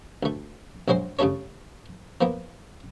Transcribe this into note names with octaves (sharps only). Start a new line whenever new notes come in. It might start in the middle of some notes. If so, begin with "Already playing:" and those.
D2 A3
A#1 F#3 G#3 C5 C6
C#3 G3 A3 A4 C#5
F3 A#3 B3